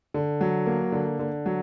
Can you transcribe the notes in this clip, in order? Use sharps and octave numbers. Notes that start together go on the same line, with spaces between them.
D3
F#3
A#3
D3
D3
F#3